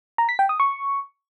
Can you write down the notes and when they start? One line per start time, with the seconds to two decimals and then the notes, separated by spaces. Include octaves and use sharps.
0.18 A#5
0.29 B6
0.39 G5
0.49 D#6
0.60 C#6